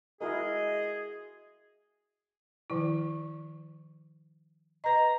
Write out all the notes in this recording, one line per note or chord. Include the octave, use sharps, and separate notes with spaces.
G#3 E4 F#4 G#4 A#4 D#5
D#3 F3 E4
B4 D#5 A#5